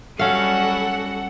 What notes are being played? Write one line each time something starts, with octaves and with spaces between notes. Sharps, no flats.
F#3 G3 C#4 F#4 A4 F5 F#5